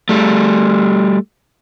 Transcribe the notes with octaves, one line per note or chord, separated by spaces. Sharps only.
G3 A3